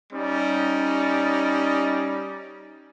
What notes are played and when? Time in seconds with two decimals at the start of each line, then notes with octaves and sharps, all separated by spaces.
0.13 G3 C#4 D#4